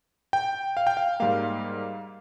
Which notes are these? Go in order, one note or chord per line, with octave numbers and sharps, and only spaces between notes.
G5
F5
G5
F5
G#2 G3 A#3 F5